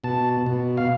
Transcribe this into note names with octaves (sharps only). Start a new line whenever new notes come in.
B2 A5
B2
F5